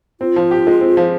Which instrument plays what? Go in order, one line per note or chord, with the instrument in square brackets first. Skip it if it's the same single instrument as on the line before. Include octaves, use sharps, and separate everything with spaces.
[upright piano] C4 [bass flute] F4
[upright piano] F3
G4
G#3
C4
F3